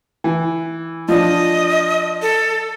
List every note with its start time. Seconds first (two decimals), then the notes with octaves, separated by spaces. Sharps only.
0.24 E3
1.08 F3 D4 D#5
2.22 A4